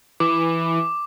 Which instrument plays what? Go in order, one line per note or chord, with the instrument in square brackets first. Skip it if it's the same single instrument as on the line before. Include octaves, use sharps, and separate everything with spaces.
[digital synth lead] E3 [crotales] D6